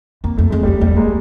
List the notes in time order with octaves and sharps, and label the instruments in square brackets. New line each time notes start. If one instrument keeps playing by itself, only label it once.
[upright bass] F2 [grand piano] A#3
[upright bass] F2 [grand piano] A3
[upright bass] F2 [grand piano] G#3
[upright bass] F2 [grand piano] G3 A3
[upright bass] E2 [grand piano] G3 A3
[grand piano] G#3 A#3